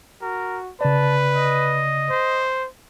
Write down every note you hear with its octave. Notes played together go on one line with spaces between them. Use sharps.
F#4 A#4
C#3 B4 D5 A5
D#5
C5